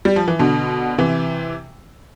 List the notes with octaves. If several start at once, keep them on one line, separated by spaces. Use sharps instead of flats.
G3
F3
E3
B2 D3
C3 E3